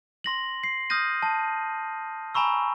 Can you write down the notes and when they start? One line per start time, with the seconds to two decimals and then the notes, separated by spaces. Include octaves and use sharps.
0.24 C6 A#6 F#7
0.64 C7
0.90 D#6 F6 G6 A#6 D#7
1.23 A5
2.35 G#5 A#5 B5 C#6 E6